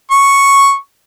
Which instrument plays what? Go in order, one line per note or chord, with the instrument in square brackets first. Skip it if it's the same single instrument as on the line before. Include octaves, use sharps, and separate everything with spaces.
[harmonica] C#6